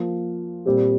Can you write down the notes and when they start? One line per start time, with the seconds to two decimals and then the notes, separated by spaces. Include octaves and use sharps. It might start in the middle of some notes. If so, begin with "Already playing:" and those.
Already playing: F3 A#3 F4
0.66 A#2 G3 C4 G4